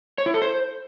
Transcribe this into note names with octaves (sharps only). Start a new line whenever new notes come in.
C#5
E4
A4
C5